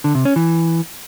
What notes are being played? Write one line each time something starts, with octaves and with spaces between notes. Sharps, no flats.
D3
C3
C#4
E3